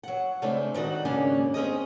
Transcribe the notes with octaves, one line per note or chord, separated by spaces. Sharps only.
F#3 F#5
C#3 G#3 A3 C4 D4 E4
D#3 D4 D#4 F#4
D#2 G#2 C#3 A#3 C#4 D4
C4 C#4 G#4 D#5